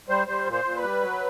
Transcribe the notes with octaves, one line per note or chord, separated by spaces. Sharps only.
G3 C5
G3 C5
A#2
C5
A#2
B4
G3
F#3